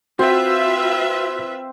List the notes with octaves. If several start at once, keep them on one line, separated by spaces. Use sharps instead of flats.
C4 F4 F#4 B4 E5